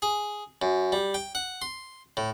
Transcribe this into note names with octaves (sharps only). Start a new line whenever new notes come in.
G#4
F#2
G3
G5
F#5
C6
A2